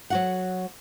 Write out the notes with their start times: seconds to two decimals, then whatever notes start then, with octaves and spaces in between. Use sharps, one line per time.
0.10 F#3 F#4 F#5